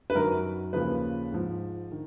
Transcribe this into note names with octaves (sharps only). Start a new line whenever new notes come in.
B4
F#2 D#3 F#3 A#4
D#2 C#3 F3 B4
G#2 F3
D#3